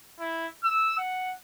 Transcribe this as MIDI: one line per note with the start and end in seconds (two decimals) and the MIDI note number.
0.20 0.47 64
0.63 0.98 88
0.98 1.34 78